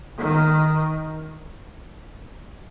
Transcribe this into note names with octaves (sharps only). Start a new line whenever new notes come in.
D#3